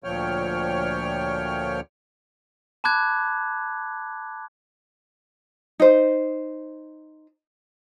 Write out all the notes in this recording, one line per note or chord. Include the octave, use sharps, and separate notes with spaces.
D2 A#2 F3 C#5 G5 F6
A5 B5 D6 F#6 G#6
D#4 C5